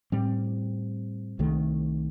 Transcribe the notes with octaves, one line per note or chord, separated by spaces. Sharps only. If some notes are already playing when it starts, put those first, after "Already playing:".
A2 G3 C4
C2 C3 D#3 A3